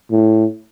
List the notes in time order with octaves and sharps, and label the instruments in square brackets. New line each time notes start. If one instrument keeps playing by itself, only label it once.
[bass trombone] A2